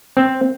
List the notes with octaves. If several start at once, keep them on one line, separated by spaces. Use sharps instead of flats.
C4